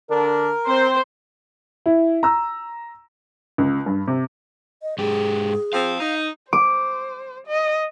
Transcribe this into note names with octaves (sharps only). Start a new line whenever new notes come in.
D3 D4 A#4
C4 C5
E4
A#5 E6
C#2
G2
C3
D#5
G#2 G4 G#4
F3 C4 F5
D#4
C5 D6
D#5